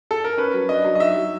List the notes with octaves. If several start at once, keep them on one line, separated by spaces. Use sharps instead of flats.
A4
A#4
C#4 B4
F#3
D4 D#5
F#3
D#5
D#4 E5
F#3